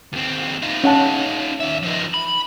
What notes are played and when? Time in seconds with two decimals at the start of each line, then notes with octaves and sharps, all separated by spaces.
0.13 D#2 C4
0.62 D#4 F4
0.84 C#4 F#5 A5
1.60 D#2 E5
1.83 F3 D#4
2.14 B5